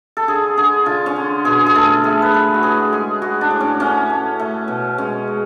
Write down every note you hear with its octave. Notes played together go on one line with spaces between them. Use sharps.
A4
D3 G#4
D3 G#4
D3 F4
C#4
D3
B2 G#4
G#4
A3 A4
A3 G#4
B4
A3 A4
F#4
A2 G#4
G#3 G#4
G#3 F#4
D4
A2
C#4
A3 C#4
A3
A3
B2
G#3 C#4
G#3